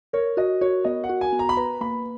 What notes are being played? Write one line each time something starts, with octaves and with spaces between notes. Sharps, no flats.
A#4 C#5
F#4 D#5
F#4 C#5
B3 D#5
F#5
F#4
G#5
B3
A#5
B5
B4 A#5
A#3 B5